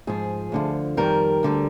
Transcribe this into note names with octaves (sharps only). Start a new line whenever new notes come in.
G#2 F3 G#4
D2 D3 F3
F2 D#3 G3 A#4
D2 D3 G3